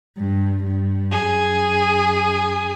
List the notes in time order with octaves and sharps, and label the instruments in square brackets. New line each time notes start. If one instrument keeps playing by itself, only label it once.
[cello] G2
G2
[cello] F#2 [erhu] G#4